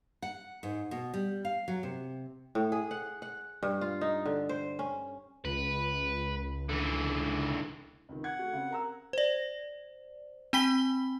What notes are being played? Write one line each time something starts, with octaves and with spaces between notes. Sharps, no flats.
F#5
G#2
B2
G3
F5
F#3
C3
A2
G#4
F#5
F#5
G2
F4
D#4
D3
C5
C#4
C#2 B4
D3 E3
C#2 C3 D#3
F#5 G#6
A3 F#4
C#3 C4
A#4 A#5 E6
C5 D5
C4 G5 B5 B6 G7